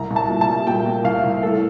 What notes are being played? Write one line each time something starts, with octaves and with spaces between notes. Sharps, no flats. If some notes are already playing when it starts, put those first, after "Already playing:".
Already playing: C2 A#5
C2
A5
A#2
A5
G3
A#2 G5
A#2
C2 F5
C2
A2 A4